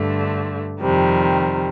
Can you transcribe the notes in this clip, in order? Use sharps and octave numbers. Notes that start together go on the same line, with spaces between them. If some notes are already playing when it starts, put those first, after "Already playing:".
Already playing: G2 D3 A3
F2 C3 D#3 G3